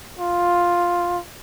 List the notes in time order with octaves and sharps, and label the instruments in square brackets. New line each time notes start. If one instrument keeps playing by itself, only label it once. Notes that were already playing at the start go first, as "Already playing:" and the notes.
[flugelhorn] F4